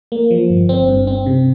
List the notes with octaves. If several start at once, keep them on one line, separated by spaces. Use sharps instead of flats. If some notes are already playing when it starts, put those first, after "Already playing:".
A#3
F3
G1
C4
G2
C4
C3